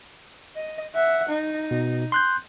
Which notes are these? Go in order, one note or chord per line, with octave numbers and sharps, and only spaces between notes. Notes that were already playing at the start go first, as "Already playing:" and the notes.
D#5
E5 F#5
D#4
B2
C6 F#6 G6